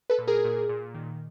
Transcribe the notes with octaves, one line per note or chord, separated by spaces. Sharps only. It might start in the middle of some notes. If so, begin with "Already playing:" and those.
A4 B4
A#2
G#4 A#4
A#2
A#2
D#3